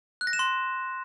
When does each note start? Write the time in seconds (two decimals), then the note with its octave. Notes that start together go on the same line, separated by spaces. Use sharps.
0.21 F#6
0.27 A#6
0.33 E7
0.39 C6